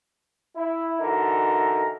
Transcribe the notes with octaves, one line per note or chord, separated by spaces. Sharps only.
E4
D3 E3 D#4 F#4 A4 A#4